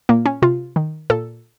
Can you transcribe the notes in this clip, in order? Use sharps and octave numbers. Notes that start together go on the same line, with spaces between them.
A#2 A#3
C#4
C3 F4
D#3
A#2 A4